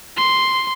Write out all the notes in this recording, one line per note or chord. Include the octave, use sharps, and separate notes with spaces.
C6